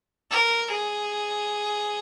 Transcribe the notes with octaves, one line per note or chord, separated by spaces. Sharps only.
A#4
G#4